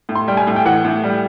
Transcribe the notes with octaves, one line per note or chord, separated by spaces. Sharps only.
A2
C6
G3 G5
G#5
A2
G5
E3 F#5
A2
G3